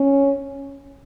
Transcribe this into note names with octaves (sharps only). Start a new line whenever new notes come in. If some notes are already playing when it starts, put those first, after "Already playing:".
Already playing: C#4